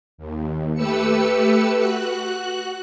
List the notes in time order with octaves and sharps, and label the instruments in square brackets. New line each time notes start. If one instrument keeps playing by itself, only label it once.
[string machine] D#2
A3 G4 B4 E6 C#7
F#4 F#6